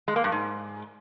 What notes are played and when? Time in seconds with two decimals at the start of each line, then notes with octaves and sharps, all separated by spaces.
0.08 G#3
0.16 A#3
0.24 G2
0.32 G#2